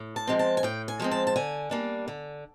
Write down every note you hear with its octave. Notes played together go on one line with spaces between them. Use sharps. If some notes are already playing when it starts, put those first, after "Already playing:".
Already playing: A2
A5
F3 G#3 C4
A5
G#5
A2 G5
G#5
F3 G#3 C4
A5
A5
D3 G#5
G3 A#3 D4
D3